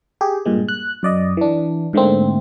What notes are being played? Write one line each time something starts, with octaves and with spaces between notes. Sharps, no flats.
G4 G#4
G2 A#2 G#3
F#6
F#2 D5 D#5
E3 D4
G#2 D3 A3 A#3 C4